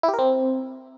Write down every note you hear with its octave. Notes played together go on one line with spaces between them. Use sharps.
E4
G4
A#4
C4